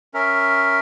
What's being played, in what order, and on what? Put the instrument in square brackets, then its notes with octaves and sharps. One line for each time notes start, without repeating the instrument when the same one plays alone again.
[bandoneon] C#4 A#4 E5